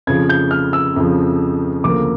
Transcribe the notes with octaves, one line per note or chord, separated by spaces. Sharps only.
F2 C#3 F3 G#6
G6
F6
E6
F2 C#3 F3
D2 C#3 F3 A#3 D6